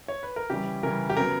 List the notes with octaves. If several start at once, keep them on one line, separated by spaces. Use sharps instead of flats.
C#5
B4
A#4
C#3 E3 G3 C#4 G4
C#3 E3 G3 C#4 A#4
G4
C#3 F#3 B3 A#4